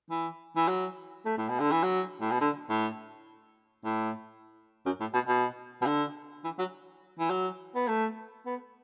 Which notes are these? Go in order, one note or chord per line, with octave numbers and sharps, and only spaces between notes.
E3
E3
F#3
A3
A2
B2
D3
E3
F#3
A2
B2
D3
A2
A2
F#2
A2
B2
B2
B2
D3
E3
F#3
E3
F#3
B3
A3
B3